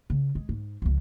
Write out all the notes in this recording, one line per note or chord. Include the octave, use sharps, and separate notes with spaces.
C#3
G#3
G#2
C#2 F3